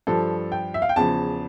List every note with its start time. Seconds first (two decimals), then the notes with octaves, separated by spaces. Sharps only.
0.07 G2 F3 A4
0.52 G5
0.74 E5
0.82 F5
0.89 G5
0.96 E2 C#3 F3 A5